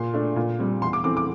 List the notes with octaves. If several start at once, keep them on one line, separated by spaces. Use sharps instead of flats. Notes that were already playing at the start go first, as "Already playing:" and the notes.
Already playing: A#2 C6
A3 D4
A#2
G3 C4
E2 C6
D6
E3 A3 C4 D6
D6